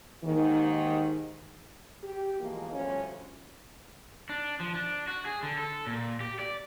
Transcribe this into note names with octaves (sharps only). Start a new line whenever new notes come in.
D#2 G#2 D#3
G4
B2 E3 F3 G#3 A#3
D2 F3 G3 C#4
D4
F3
D4
F#4
G#4
D3
A4
A#2
G4
D5